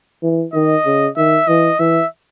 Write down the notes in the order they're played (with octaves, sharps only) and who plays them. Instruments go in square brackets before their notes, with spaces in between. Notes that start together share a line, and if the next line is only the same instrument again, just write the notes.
[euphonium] E3
[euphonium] D#3 [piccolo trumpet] D#5
[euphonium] C#3
[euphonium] D#3 [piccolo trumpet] E5
[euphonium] E3 [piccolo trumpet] D#5
[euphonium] E3 [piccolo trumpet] E5